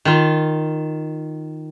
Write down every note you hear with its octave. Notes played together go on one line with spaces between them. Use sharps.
D#3 F4